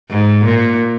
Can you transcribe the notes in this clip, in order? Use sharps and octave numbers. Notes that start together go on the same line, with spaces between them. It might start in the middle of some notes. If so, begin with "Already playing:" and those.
G#2
A#2